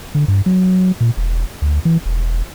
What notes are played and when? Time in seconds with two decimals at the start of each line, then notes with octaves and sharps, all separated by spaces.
0.15 D3
0.28 G2
0.46 F#3
1.01 A#2
1.17 E1
1.62 D2
1.85 E3
2.06 E1